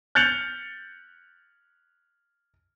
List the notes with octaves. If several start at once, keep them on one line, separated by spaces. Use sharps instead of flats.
F#6 G6 A6 C#7 F7 F#7